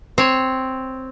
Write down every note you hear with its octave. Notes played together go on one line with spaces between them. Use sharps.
C4 C#5